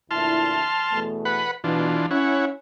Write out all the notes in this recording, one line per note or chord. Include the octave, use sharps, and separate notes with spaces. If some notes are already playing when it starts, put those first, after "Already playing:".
D2 A#2 E4 A5 C6 F6
E2 B2 A3
B4 F#5 B5
B2 E3 D4 F4
C#4 E4 C#5 F#5